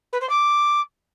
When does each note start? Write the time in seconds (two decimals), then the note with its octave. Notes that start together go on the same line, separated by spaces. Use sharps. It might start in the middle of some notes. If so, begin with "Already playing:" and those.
0.12 B4
0.21 C5
0.29 D6